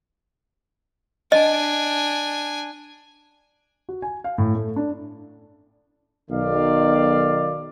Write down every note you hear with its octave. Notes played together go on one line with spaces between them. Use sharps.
D4 D#5 G#5
F#4
G#5
F5
A2
A3
D4
B1 D#3 D5 F5